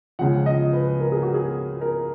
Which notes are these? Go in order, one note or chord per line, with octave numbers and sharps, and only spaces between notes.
C#2 C#3 F3 F#5
D#5
B4
A#4
G#4
F#4
G#4
A#4